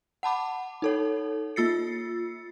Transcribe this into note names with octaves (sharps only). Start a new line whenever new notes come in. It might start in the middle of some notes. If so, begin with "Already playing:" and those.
F#5 A5 B5 D6
D#4 A4 C#5
A#3 F4 E6 A6 C7 C#7